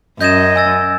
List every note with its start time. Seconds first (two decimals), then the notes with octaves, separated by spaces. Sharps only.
0.21 F#2 D#5 G6 G#6 E7
0.56 G#5 E6 A6